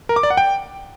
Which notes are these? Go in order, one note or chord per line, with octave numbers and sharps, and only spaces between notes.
A#4
D6
D5
F#5
G5